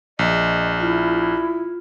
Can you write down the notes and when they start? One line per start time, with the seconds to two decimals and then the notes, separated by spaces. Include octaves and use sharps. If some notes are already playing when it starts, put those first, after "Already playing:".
0.19 A#1 D#5
0.80 E4 F4